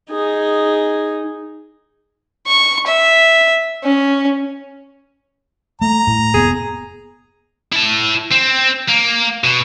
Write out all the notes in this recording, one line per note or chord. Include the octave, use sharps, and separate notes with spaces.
D#4 G#4
C#6
E5
C#4
A3 A#5
A2
F1 B3 G#4
E4 A5
C4
A#3
B2